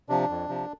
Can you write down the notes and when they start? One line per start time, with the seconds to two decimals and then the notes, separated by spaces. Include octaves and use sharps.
0.09 C3 F3 D4
0.30 F2
0.49 C3 F3